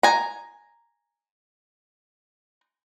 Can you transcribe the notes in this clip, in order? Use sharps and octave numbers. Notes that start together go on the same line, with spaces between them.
G#5 A#5